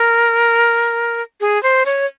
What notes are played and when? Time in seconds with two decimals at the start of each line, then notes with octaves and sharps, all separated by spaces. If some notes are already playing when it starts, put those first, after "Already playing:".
Already playing: A#4
1.41 G#4
1.63 C5
1.86 C#5